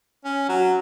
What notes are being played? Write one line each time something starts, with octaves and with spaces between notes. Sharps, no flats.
C#4
F#3